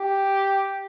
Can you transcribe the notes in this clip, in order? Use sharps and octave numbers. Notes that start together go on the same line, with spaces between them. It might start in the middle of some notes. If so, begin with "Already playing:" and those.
Already playing: G4